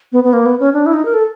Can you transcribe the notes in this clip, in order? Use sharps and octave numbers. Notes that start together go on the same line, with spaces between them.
B3
B3
A#3
B3
C#4
D4
E4
D#4
A#4
A4